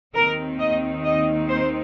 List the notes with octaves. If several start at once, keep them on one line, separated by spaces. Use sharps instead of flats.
D#2 D#3 C4 D#4 A#4
D#5
D#5
C5